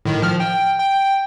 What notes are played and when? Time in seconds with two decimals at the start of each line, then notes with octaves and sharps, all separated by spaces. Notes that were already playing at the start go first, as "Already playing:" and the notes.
0.05 A2 D#3
0.22 F3 F6
0.40 G5
0.80 G5